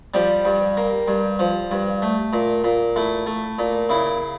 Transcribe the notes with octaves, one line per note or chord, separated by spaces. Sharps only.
F3 G3 G4
G2
A#3
G2
F3
G2
A3
A#2
A#2
A3 E4
A3
A#2
C#3 E4